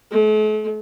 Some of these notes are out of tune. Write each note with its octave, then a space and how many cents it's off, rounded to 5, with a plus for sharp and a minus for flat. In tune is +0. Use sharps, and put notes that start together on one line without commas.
A3 -45